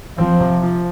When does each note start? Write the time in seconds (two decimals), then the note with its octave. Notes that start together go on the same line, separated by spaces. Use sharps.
0.18 F3 C4
0.40 C3
0.63 F3